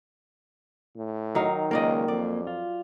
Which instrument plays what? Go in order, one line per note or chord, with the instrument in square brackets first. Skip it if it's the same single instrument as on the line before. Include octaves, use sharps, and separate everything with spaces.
[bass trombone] A2
[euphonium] D#3 [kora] F#3 D#4 F5
[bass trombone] C#2 [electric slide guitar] A#3 [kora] A#4 D5 D#5
[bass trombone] F2 [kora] D5
[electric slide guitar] F4